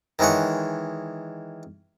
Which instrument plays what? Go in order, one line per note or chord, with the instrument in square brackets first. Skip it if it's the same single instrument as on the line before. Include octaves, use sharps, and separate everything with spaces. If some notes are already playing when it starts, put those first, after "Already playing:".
[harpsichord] D#3 E3 G#3 C#5 F#5